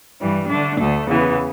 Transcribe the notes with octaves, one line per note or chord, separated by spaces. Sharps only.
G2 E3 G3
D3 A3 D4
D2 D3 A3
E2 C#3 E3 B3